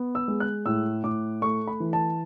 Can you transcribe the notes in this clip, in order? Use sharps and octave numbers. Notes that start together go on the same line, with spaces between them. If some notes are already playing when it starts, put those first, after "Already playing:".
Already playing: B3
E6
G#3
F#6
A2 E6
A2 D6
A3 C#6
B5
E3
A5